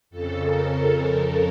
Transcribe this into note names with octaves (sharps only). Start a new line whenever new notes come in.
F2 C#3 A4
A#4